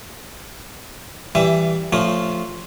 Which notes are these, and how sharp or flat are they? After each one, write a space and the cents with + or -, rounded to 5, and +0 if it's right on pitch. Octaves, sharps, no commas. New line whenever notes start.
E3 +5 G3 +0 E5 +20
F3 +0 A3 +15 C#4 +20